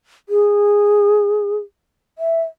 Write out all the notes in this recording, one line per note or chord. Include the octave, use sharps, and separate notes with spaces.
G#4
E5